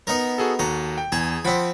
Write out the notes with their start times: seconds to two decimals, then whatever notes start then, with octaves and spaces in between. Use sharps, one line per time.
0.07 B3 D#4 A#4
0.38 F#4 G#4 A4
0.59 D#2 F#4 A4 A#5
0.98 G5
1.12 E2 G#4
1.45 F3 C4 F#5 B5 B6